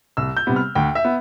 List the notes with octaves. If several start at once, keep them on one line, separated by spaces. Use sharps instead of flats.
C2 E6
G6
C3 G3 B3
F6
D2 G5
E5
B3